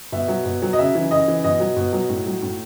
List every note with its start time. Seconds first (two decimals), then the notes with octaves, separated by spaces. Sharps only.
0.12 B2 E5
0.28 F#3
0.45 B2
0.62 F#3
0.73 D#5
0.79 C#3 E5
0.95 E3
1.11 C#3 D#5
1.28 E3
1.44 B2 D#5
1.60 F#3
1.76 B2
1.93 F#3
2.09 A2
2.26 F#3
2.42 A2